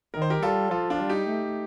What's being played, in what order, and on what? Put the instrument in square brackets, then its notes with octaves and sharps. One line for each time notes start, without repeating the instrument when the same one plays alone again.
[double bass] D#3 [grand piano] A#4
[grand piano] C5
G4 A#4
[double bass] G3 [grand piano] F4 A4
[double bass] F3 [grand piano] F4 A4
[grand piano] D4 F4
[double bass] G3
[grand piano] D#4 G4
[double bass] A3